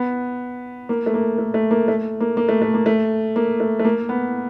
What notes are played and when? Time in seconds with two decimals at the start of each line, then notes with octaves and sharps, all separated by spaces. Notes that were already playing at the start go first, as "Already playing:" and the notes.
Already playing: B3
0.89 A#3
1.06 A3
1.14 A#3
1.38 A3
1.54 A3
1.71 A#3
1.88 A3
2.20 A#3
2.37 A#3
2.49 A3
2.62 A3
2.74 A#3
2.86 A3
3.36 A#3
3.60 A3
3.79 A3
3.85 A#3
4.09 B3